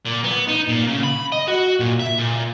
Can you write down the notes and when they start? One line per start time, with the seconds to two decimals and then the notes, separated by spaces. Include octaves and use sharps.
0.06 A#2
0.24 B3
0.48 D#4
0.68 A#2
0.87 C#3
1.04 B5
1.32 D#5
1.48 F#4
1.80 A#2
2.00 E5
2.18 A#2